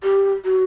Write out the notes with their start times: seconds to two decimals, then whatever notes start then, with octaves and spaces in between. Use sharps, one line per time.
0.03 G4
0.45 F#4